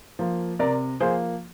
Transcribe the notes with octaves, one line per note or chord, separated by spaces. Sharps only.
F3 A#3
C3 A#4 D5
F3 A#3 G#4 C5